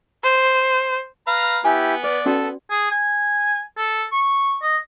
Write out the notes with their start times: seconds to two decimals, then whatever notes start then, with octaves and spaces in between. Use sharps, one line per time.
0.24 C5
1.27 B4 F5 A#5
1.65 B3 E4 G4 G#5
2.04 B4 D5
2.26 C#4 F#4 A4 D5
2.70 G#4
2.91 G#5
3.77 A4
4.12 C#6
4.62 D#5